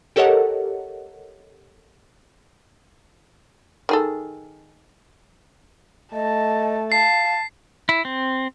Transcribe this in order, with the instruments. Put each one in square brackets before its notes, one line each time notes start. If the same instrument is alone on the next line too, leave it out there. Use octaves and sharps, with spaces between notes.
[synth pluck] G4 A4 A#4 C#5 D#5 F#5
[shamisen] D#3 G#4 A4
[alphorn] A3 [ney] D#5 [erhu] A5
[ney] F5 [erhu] A5 [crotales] C7
[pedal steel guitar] E4
C4